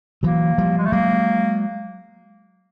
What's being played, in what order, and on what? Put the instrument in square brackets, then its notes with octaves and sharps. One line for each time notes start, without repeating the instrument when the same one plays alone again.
[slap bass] E3 F#3 [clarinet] A#3
[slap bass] F3 G3
[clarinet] G#3
A3
[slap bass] F#3 G#3 [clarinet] A#3